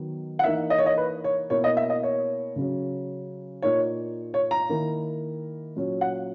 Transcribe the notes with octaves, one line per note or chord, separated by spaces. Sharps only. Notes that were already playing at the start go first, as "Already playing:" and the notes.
Already playing: D#3 F#3 B3
F#5
E3 A#3 D#4 E5
D#5
C#5
D#5
B4
C#5
B2 A#3 E4 C#5
D#5
E5
D#5
C#5
C#3 F#3 C#4
A#2 A#3 D#4 C#5
C#5
A#5
D#3 A#3 E4
A#2 F#3 C#4
F#5